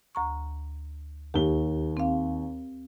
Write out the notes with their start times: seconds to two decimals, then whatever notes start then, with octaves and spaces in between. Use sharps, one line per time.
0.15 D2 A#5 C#6
1.34 D#2 G4 G7
1.97 C4 F5